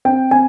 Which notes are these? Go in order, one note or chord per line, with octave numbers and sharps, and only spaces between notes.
C4 G5
C4 G#5